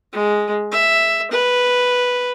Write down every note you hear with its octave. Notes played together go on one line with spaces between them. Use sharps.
G#3
E5
B4